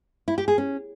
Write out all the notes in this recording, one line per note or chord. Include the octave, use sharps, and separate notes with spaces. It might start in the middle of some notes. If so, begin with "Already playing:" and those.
E4
G4
G#4
C#4